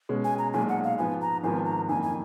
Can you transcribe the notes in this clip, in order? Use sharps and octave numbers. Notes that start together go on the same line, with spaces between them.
B2 G#3 C#4
G#5
A#5
B1 A#2 G#3 G#5
F#5
F5
G#2 F3 B3 G#5
A#5
G#1 G#2 F3 B3 G#5
A#5
F#1 F2 D#3 A#3 G#5
G#5